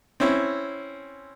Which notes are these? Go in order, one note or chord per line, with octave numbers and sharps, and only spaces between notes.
C4 C#4 E4